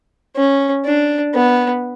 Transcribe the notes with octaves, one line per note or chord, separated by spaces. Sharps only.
C#4
D4
B3